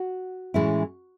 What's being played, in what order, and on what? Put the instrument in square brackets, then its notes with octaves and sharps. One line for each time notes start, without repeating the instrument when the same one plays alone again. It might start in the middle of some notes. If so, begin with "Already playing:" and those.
Already playing: [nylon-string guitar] F#4
A2 E3 G#3 C#4 E4